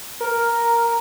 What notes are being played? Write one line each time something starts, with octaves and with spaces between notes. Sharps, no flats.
A#4